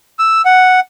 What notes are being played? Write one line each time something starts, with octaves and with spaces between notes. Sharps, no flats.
E6
F#5